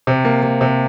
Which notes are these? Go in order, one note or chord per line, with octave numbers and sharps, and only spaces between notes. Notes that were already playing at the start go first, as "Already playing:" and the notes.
C3
A#3
A#3
C3